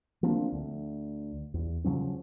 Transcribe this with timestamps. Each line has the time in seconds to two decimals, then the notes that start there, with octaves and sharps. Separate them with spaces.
0.23 F3 A#3 C4 D4
0.52 D2
1.54 E2
1.84 C#3 F3 F#3 C#4